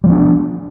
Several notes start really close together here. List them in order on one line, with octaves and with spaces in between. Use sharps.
G3 F3 B3 D4